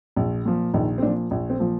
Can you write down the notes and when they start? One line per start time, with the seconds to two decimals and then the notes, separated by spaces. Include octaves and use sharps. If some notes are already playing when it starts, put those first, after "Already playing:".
0.16 A#1
0.45 A#2 F3
0.74 A#1 D#3 D#4
0.98 C4
1.02 A#2 D4
1.07 F3
1.31 A#1
1.50 C4
1.60 A#2 F3